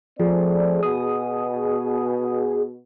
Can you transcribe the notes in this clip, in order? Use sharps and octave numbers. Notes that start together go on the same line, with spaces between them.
F3 A3 C4 G#4 D5
B2 D#6